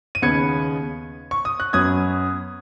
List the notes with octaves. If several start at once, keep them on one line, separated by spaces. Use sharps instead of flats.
D#7
D#2 C#3 B3 G#6 C#7
C#6
D#6
F#6
F#2 F#3 B3 D#6 G#6